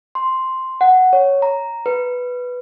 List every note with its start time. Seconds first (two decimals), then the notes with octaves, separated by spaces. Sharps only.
0.15 C6
0.81 F#5
1.13 C#5
1.42 A#5
1.86 B4